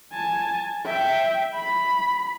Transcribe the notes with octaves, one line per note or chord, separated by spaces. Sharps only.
G#5 A5
E5 G5
B5